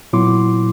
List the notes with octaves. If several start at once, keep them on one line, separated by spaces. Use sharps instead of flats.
A#2 F#3 B3 E4 C6 D6